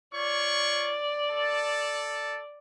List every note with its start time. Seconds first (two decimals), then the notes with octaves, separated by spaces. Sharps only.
0.15 F4 C#5 D5 C#6
1.31 A4 A5